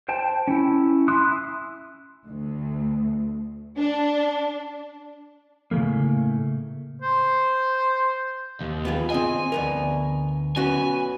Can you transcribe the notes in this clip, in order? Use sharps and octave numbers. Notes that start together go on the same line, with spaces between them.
C5 G5 A5
C#4 E4
E4 C6 D#6 F#6
D2
D4
A2 C#3 E3 A3 A#3
C5
D#2
B3 F4 G#4
C4 G#4 D#5 G#5
D2 B3 A#4
B3 C#4 F#4 G#5